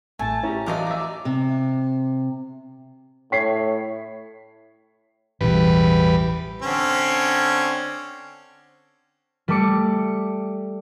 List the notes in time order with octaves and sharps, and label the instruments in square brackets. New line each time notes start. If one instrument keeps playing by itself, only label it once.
[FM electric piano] A1 A2 [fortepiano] A3 [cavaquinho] G#5 [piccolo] A5
[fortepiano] C#4 G4 [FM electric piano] E4 [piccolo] A#5
[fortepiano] A1 F#3 D6 [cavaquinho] D5 D#5 F5
[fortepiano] E5 D6
[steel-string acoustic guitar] C3
[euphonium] A2 [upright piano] C#5 B6 C7
[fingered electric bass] A1 B2 E3 [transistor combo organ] E2 G3 B4
[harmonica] D3 C4 C#4
[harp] G3 A3 D6 C#7